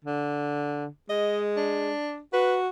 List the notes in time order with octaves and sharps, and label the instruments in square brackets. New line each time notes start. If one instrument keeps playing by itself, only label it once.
[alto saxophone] D3
[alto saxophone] G#3 [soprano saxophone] D#5
[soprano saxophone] D4
[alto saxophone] F#4 [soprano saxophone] B4